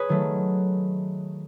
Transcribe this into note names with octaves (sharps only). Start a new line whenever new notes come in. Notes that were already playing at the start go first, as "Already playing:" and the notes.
Already playing: G#4 B4 C#5
D#3 F#3 A3